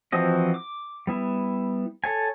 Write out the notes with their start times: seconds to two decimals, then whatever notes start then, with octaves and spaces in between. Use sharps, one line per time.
0.12 E3 F3 C4 F#4 D#5
0.54 D6
1.07 G3 B3 E4
2.04 A4 C#5 G#5